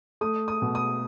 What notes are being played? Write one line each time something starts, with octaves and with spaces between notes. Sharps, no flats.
A3 D#6
D#6
B2
D#6